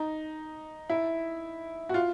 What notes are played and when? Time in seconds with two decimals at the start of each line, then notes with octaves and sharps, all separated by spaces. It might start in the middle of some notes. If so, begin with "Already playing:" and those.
Already playing: D#4
0.90 E4
1.89 F#4
1.94 F4